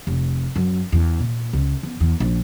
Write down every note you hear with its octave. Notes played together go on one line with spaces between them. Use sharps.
F1
F#2
E2
A#2
C#2
E2
E2
A#1